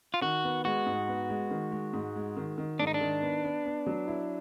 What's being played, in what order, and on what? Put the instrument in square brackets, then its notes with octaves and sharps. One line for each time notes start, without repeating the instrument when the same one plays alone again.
[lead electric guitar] F4
[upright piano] D#3 [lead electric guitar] F#4
[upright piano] B3
[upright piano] G#3 [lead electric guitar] F#4
[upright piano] G#2
B3
G#3
D#3
G#3
G#2
G#3
D#3
D#3
[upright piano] G#2 [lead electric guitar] D4
[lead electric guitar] D#4
D4
[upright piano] D#3
B3
B3
B3
F#3
E4